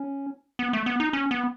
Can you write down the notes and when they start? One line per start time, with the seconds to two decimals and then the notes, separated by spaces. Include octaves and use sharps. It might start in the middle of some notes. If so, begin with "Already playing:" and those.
Already playing: C#4
0.59 B3
0.73 A3
0.86 B3
1.00 D#4
1.13 C#4
1.31 B3